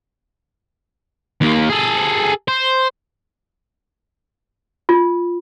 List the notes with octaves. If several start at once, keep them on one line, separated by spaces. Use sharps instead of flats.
D#2 A#3
G#4 A4
C5
F4